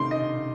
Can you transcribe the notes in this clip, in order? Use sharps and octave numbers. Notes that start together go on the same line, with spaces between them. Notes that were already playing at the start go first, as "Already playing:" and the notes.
Already playing: C3 D#3 A3 C6 D6
D#5